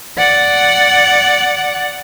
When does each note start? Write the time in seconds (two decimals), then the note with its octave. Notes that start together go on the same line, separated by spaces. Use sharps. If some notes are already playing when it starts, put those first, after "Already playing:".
0.18 D5 F#5